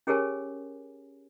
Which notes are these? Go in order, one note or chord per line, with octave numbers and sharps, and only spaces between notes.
C#4 G4 G#4 A#4 C#5 G#5